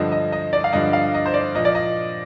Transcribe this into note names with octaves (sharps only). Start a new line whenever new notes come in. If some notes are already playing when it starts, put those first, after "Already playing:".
Already playing: G2 D3 F3 D#5
D#5
D#5
D5
F5
G2 D3 F3 D#5
F5
D#5
C5
D5
A#2 F3 D#5
D5
D#5